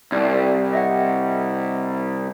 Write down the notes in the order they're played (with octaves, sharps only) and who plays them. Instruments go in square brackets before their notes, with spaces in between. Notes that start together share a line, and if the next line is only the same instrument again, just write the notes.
[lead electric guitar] C2 [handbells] C4 D5
[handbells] D#5 E5 F#5